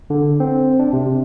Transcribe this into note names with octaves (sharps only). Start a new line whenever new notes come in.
D3
C4
D4
C3